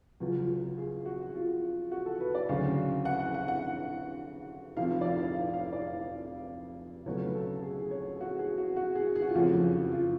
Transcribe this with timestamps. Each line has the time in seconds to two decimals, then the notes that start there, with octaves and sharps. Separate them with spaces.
0.20 C#2 C#3 F#3 F4
0.40 F4
0.78 G#4
1.05 F#4
1.35 F4
1.91 F#4
2.06 A4
2.20 B4
2.35 D5
2.49 D2 C#3 F#3 C#4 F5
3.05 F#5
3.20 F#5
3.34 F#5
3.48 F#5
4.77 F1 F2 F3 F5
4.92 F5
5.01 D5
5.06 F5
5.20 F5
5.35 F5
5.54 F5
5.73 D5
7.05 C#2 B2 F#3 A3 C#4 C#5
7.21 B4
7.35 A4
7.62 G#4
7.77 G#4
7.91 C#5
8.20 F#4
8.39 G#4
8.58 F#4
8.76 F#4
8.95 G#4
9.16 G#4
9.22 F#4
9.29 F4
9.34 F#1 F2 F3 A3 C#4 F#4
9.92 F4